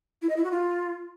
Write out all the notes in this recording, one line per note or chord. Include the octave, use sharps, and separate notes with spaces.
E4
D#5
E4
F#4
F4